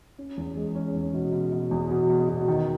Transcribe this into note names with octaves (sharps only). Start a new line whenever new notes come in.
C#4
E2
G#3
C#4
E2
B2
B2
B2
E2
B2
B2
B2
D#3